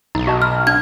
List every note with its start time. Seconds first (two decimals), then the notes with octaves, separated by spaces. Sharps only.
0.15 B1 D#4
0.27 F#4 D#5 A5
0.42 F6
0.67 D4 G#6